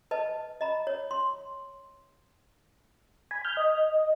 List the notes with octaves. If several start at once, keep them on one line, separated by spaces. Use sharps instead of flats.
B4 D#5 A5
D#5 A#5 B5
C#5
C6
G#5 B5
F6 G6
D#5